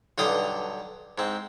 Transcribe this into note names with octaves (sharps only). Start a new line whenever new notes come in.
B1 G2 D3 F5 G5 D#6
G#2 C4